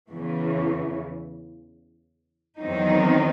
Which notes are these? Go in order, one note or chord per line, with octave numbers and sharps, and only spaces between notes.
E2 C#3 E3
E2 D#3 F#3 C4 D#4